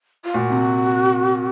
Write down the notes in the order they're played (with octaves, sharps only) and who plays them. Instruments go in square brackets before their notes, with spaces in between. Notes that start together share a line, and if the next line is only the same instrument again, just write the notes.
[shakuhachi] F4
[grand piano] A#2 [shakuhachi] F#4
[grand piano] C3